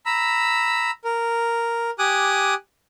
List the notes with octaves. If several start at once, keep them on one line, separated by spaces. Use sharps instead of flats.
A#5 B5 E6
A#4
G4 G#5 D6 D#6 F#6